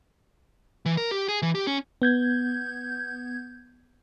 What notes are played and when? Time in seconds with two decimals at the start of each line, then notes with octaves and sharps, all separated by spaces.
0.86 E3
0.97 A#4
1.11 G4
1.28 G#4
1.42 E3
1.55 G4
1.67 C#4
2.02 B3 G6 G#6